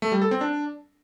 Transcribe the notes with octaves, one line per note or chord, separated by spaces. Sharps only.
A3
G3
A4
C4
D4